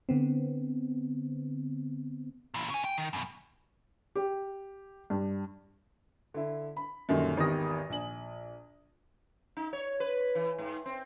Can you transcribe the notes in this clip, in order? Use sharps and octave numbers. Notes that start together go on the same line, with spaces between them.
D3 B3 C4
A#2 E3
C#3 G#5
G5
D#3
F#2 B2
G4
G2
D3 E4
B5
F#2 A#2 D3 D#3 G3
G#1 E2 D#3 G4 D#6 A#6
A#1 G#5 F#7
D#4
C#5
B4
E3
G#2
C4